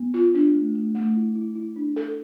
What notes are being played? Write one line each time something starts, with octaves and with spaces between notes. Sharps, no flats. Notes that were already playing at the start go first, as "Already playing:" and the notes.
Already playing: B3
F4
D4
A3
A3
A3
E4
E4
E4
D4
A4